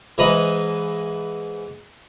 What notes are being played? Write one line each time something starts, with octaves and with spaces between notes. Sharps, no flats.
G#2 E3 D#5 A#5 B5 D#6